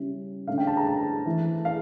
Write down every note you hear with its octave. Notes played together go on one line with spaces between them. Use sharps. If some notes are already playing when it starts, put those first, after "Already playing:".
Already playing: C#3 G3 C#4 E4
D3 A3 C#4 F5
G5
A5
A#5
A5
E3 A3 E4
F5